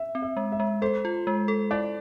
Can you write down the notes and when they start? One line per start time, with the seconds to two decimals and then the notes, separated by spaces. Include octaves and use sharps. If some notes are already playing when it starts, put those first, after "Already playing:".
Already playing: E5
0.15 C4
0.22 E5
0.37 G#3
0.52 E5
0.60 G#3
0.82 A4 C5
1.05 F4
1.27 G#3
1.48 A4
1.71 E4 D5